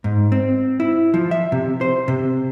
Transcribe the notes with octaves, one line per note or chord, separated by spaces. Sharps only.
G#2
C4
E4
F3
E5
C3
C5
C3